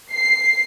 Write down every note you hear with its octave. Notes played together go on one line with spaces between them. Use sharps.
C7